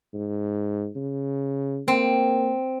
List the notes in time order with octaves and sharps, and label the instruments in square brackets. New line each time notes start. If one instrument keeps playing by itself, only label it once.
[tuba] G#2
C#3
[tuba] A#3 [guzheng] C4